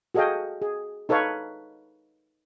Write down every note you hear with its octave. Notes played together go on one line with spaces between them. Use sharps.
F#4 G#4 A4 D#5 F5 G5
G#4
D#4 A4 B4 C#5 F5